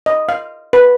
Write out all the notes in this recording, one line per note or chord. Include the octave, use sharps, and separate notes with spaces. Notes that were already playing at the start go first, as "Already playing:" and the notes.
D#5
F5
B4